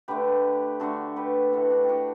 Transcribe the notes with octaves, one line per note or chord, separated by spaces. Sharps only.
D3 A3 G4 B4
D3 A3 F#4 A4
G4 B4
A2 E3 A3 F#4 A4
D4 F#4
G4
D4 F#4